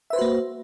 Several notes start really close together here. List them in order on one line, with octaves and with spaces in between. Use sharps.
E5 B4 C5 F#4 A#3